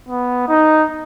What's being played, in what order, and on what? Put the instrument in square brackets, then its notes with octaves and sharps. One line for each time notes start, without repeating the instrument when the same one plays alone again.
[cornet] B3
D#4